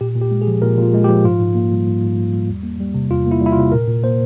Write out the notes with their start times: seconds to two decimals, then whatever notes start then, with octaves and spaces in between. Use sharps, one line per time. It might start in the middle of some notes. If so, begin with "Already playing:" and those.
0.01 A#2 G4
0.15 A#2
0.21 G4
0.31 G#3
0.42 G#4
0.47 F3
0.62 A#2 A#4
0.78 A#2 F4
0.94 G#3
1.04 G4
1.09 F3
1.24 G#2 F4
1.40 G#2
1.55 A#3
1.71 G3
1.87 G#2
2.02 G#2
2.17 A#3
2.33 G3
2.49 E2
2.63 A#3
2.80 G3
2.94 C3
3.10 E2 F4
3.26 A#3 E4
3.41 G3 E4
3.52 F4
3.57 C3
3.72 A#2 A#4
3.87 A#2
4.03 A#3 C5